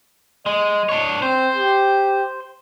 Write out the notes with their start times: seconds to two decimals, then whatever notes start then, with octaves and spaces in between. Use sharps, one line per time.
0.46 G#3 D#5
0.89 D4 C#5
1.22 C4 C5
1.56 G4